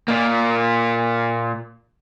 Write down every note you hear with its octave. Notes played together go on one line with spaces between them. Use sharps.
A#2 A#3